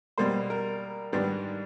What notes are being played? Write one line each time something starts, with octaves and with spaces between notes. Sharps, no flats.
B2 G3 A#3 C5
A#4
G#2 D#3 G3 B3 D4